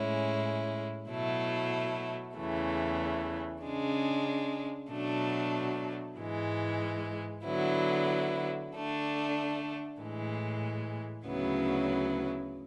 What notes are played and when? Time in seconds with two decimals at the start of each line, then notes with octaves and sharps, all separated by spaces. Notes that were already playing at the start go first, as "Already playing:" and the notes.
Already playing: A2 G#3 C#4 E4
1.09 B2 F#3 A3 E4
2.36 E2 C#3 E3 A3
3.63 C#3 G#3 D4
4.91 B2 F#3 A3 D4
6.18 G#2 E3 G#3
7.45 D3 F#3 B3 E4
8.73 D3 A3 D4
10.00 A2 E3 G#3
11.27 D2 C#3 F#3 B3 E4